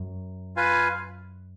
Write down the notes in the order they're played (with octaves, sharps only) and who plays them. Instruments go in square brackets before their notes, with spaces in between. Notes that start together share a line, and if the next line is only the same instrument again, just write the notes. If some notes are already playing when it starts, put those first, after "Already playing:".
Already playing: [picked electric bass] F#2
[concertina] F4 B4 F5 G#5